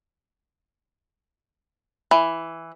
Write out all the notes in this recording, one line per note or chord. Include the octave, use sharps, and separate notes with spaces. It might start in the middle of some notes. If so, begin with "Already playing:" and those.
E3